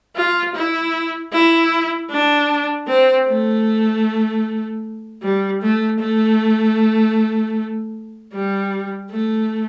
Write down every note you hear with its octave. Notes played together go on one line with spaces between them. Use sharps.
F4
E4
E4
D4
C4
A3
G3
A3
A3
G3
A3